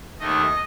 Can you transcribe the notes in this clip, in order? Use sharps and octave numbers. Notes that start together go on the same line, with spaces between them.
D#2 D#3 A3 D#5